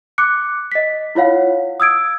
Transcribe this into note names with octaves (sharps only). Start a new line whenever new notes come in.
D6 F#6 C#7
D#5 B6
E4 F4 C#5 F5 F#5
D#6 E6 G#6 D7